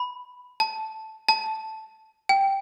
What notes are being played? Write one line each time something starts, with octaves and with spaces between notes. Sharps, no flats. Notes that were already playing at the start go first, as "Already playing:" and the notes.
Already playing: B5
A5
A5
G5